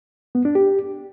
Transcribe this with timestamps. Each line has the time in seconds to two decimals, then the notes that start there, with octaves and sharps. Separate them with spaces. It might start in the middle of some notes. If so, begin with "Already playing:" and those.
0.35 B3
0.45 D4
0.55 G4